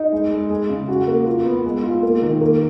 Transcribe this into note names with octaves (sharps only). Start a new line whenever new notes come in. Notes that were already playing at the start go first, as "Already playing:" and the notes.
Already playing: D#4
G#3
G#3
G#3
C#3
F#4
A#3
F4
B3
G#3
F4
A#3
D#3
A#3